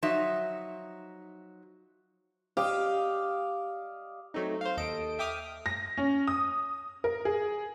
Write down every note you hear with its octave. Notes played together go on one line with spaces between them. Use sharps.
F3 F#3 D#4 E5
G4 D5 D#5 F5
F#3 A3 C4 D#4
C5 F5
D#2 A4 D#5 D7
E5 G5 D6 D#6 F6
A#6
C#4
D#6
A#4
G#4